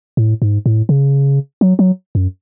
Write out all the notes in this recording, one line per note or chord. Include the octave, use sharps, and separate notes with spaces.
A2
G#2
A2
C#3
F#3
F#3
F#2